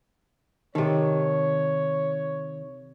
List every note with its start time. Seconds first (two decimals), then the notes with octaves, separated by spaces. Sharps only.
0.75 C3 D#3 A4 C#5